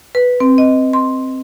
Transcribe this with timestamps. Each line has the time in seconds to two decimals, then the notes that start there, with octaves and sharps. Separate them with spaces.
0.15 B4
0.40 C4
0.58 D#5
0.93 C6